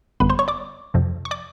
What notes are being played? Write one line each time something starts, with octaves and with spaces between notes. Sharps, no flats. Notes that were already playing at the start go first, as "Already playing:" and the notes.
G#1 F#2 D3 G3 B3 B4 B5
C5 C6
C#5 C#6
D5 D6
F2 C3 F3 A3 C4
C#6
D5 D6